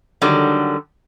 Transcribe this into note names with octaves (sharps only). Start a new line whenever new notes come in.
D3 D#3 F#3 G3